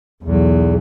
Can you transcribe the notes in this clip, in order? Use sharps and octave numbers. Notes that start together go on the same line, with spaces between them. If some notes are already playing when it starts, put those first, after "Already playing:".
B1 E2 F#3